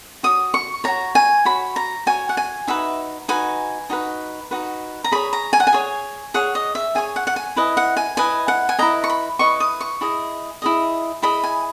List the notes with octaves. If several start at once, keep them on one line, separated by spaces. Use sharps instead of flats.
F#4 C#5 D#6
C#6
F#4 C#5 A#5
G#5
F#4 C#5 B5
A#5
F#4 C#5 G#5
F#5
G#5
D#4 F#4 B4 E5
D#4 F#4 B4 G#5
D#4 F#4 B4
D#4 F#4 B4
A#5
G#4 C#5 B5
A#5
G#5
F#5
G#5
G#4 C#5
G#4 C#5 F#5
D#5
E5
G#4 C#5 G#5
F#5
F#5
G#5
E4 B4 D#5
F#5
G#5
E4 B4 D#5 G#5
F#5
G#5
E4 B4 D#5 A#5
C#6
B5
E4 B4 D#5 C#6
D#6
C#6
E4 G#4 D#5
E4 G#4 D#5
E4 G#4 D#5 B5
G#5